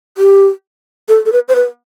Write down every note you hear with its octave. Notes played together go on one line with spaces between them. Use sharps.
G4
A4
A4
B4
C5
B4